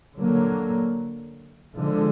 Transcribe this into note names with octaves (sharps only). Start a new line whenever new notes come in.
D3 F#3 A#3
D3 F3 G#3